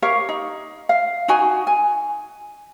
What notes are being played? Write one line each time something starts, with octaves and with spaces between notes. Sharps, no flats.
G4 A#4 C#5 F5
D#4
F5
D#4 F#4 G#5
G#5